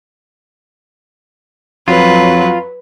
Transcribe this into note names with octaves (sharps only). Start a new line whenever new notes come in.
F2 F#3 F4 B4